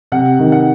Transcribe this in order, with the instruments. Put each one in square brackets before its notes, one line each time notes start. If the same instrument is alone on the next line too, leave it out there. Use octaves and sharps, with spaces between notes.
[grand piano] C3 F#5
D#3
F#5